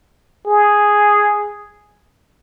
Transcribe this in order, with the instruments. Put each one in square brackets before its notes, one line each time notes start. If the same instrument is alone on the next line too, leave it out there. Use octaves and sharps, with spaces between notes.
[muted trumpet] G#4